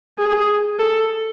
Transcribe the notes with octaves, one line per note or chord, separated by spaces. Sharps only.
G#4
A4